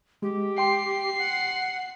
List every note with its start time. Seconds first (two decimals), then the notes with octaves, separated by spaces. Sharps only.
0.22 G#3 G4
0.58 G5 C6 C7
1.19 F#5